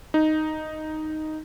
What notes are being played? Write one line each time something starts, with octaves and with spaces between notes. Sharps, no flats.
D#4